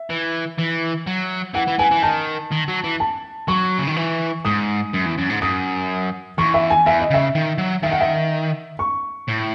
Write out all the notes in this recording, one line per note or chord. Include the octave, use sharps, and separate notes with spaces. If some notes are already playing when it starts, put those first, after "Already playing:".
Already playing: E5
E3
E3
F#3
E3 F#5
E3
E3 G#5
E3
D#3 A5
D#3
F#3
E3
A5
F#3 C#6
C#3
D#3
E3
G#2 D#6
F#2
E2
F#2
G#2
F#2 D#6
E2 C#6
E5
G#5
E2 E5
D#5
C#3 E5
D#3
F#3
D#3 E5
F#5
E5
C#6
A2